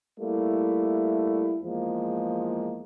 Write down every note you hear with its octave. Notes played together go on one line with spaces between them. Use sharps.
G3 A3 A#3 E4
E2 F3 G#3 A#3